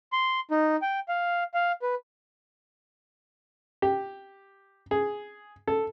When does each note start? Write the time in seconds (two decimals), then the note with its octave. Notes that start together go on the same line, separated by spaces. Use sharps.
0.13 C6
0.51 D#4
0.82 G5
1.08 F5
1.54 F5
1.82 B4
3.82 G4
4.91 G#4
5.67 A4